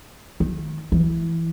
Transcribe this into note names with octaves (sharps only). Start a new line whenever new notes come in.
D#3
E3